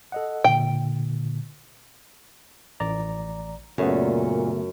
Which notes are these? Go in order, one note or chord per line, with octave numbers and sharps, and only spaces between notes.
A4 D#5 F#5
A#2 D3 G5
A1 D5 A#5
F#2 A#2 C#3 A3 B3